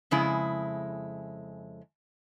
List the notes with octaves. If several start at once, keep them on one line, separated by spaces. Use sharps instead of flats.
F2 C#3 G#3 E4